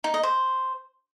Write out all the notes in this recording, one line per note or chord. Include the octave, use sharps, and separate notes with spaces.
D#4
D#5
C5